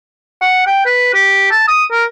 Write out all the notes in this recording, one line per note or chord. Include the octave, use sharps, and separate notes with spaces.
F#5
G5
B4
G4
A5
D#6
A#4